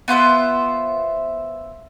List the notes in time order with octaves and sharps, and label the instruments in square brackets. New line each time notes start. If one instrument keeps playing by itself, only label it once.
[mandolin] B3 F4 C5 E5